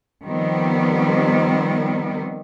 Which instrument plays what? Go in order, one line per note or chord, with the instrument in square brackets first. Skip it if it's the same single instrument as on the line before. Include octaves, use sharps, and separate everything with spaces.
[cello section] D#3 F3 G3 B3 C4